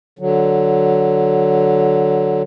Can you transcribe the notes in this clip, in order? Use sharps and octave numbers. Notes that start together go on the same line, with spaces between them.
D3 F#3